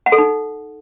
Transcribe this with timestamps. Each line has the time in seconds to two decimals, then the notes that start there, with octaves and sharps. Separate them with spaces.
0.06 F#5
0.12 A4
0.18 D#4